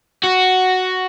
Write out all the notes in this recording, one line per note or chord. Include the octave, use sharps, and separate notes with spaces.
F#4